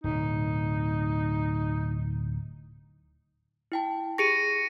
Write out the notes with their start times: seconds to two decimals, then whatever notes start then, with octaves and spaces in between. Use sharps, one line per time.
0.04 D1 B2 D#4
3.72 E4 G5 A5
4.18 G4 G#4 C#6 A#6 C#7 D#7